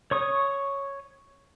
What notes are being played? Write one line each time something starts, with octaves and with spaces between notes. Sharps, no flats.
C#5 C#6 D#6